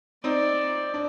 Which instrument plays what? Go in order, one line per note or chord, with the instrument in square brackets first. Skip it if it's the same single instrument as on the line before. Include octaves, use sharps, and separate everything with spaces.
[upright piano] C4 D#4 [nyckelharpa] D5
[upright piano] D4